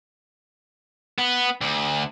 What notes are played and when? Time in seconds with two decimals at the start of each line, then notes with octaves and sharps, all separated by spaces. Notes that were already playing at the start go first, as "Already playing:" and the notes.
1.18 B3
1.61 D2